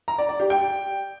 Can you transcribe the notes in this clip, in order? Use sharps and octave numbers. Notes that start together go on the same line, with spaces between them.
A#5
D5
D5
G4
G5